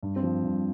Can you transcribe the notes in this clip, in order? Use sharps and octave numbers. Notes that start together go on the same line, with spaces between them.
G2
C4
F3
G2